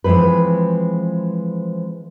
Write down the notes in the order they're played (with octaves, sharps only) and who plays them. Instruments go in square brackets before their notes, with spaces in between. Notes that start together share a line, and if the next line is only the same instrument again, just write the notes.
[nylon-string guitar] E3 F3 G#3 C4 B4